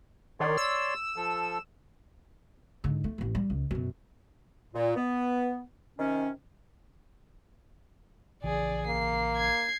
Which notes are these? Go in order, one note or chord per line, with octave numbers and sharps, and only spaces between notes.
D#3 C#5 D5 C6
E6
F3 A4
G#2 D3
A3
A1 E3
G3
C#2
F#2 B2
A#2
B3
C3 D#3 C#4
A#1 C#3 E3 G#4 D5
A#3 C7
G#6 C7